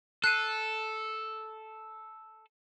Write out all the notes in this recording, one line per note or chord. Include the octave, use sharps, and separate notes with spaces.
A4 F#6 C7 D#7